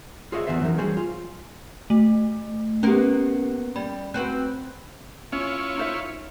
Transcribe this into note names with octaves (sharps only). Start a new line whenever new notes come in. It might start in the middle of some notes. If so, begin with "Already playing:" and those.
F4 G#4 C5 C#5 D#5 E5
E2 C3 E3 B3 C5 E5
E3 F#3 C#4 D#4 A#4
G3 F#4 G#4 C5 C#5
F4
A3
A#3 B3 C#4 G4 A#4
G3 B5
C4 F#4 B4 F#6
C#4 E4 F4 C#5
D#4 C5 E5